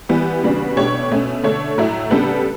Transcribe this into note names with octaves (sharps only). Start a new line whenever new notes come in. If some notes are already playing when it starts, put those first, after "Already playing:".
E3 G3 B3
C#3 G3 B3 D4 F#4
B2 A3 D4 G4 C#5
B2 A3 C#4
D3 A3 D4 A4 C#5
A2 F#3 A3 E4
C#3 G3 B3 D4 A4